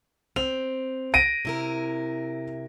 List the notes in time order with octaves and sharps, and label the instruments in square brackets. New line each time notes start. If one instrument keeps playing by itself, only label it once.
[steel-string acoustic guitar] C4 [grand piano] F7
[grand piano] A#6 D7 D#7
[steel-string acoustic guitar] C3 E4 A#4